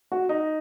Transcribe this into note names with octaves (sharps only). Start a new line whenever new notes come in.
F#4
D#4